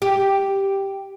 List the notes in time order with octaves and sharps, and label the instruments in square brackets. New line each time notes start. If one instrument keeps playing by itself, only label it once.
[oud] G4